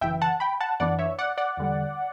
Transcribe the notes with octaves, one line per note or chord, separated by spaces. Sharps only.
G1 F#2 C#3 E3 E5 G5
F#5 A5
G5 B5
F#5 A5
F#2 E3 B3 D4 D5 F#5
C#5 E5
D5 F#5
D5 F#5
E2 D3 G3